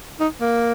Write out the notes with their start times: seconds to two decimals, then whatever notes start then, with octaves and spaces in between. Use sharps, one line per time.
0.20 D#4
0.41 A#3